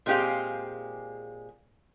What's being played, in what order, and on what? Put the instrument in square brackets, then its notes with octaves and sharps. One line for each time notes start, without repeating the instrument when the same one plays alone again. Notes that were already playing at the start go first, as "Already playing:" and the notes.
[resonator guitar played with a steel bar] A#2 G#3 C4 G4 G#4 F5